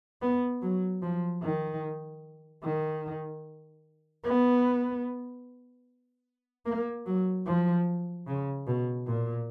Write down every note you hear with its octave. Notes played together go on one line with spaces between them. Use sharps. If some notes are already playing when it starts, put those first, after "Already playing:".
B3
F#3
F3
D#3
D#3
B3
A#3
F#3
F3
C#3
B2
A#2